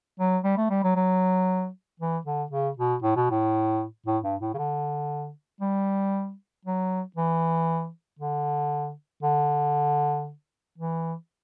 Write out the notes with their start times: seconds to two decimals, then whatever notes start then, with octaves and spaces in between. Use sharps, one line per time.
0.19 F#3
0.44 G3
0.57 A3
0.70 G3
0.84 F#3
0.96 F#3
2.00 E3
2.26 D3
2.51 C#3
2.77 B2
3.02 A2
3.16 B2
3.31 A2
4.06 A2
4.23 G2
4.41 A2
4.54 C#3
4.58 D3
5.61 G3
6.65 F#3
7.16 E3
8.19 D3
9.23 D3
10.78 E3